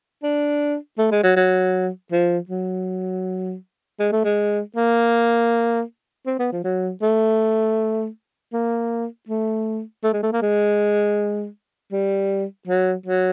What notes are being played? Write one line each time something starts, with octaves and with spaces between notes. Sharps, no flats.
D4
A3
G#3
F#3
F#3
F3
F#3
G#3
A3
G#3
A#3
C4
B3
F3
F#3
A3
A#3
A3
A3
G#3
A3
A#3
G#3
G3
F#3
F#3